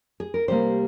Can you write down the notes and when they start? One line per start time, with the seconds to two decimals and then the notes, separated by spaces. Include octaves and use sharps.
0.20 G#4
0.34 A#4
0.48 C3 G3 A#3 C5